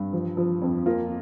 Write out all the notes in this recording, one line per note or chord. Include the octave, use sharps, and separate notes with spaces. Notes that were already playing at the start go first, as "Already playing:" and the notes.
Already playing: G2
F3
F3
F2
A#3 F4